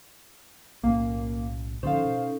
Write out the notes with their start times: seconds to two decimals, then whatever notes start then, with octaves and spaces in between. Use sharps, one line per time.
0.83 B1 A2 A#3 C#4
1.83 A#2 D3 F3 C#4 D#4 A4 C5 F5
2.05 B2